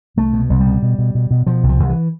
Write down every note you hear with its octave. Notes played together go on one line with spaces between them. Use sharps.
C2 A3
B2
C2
G3
B2
B2
B2
B2
B2
B2 F3
C2
F3
C2
E3